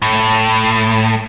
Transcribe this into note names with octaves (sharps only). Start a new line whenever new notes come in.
A2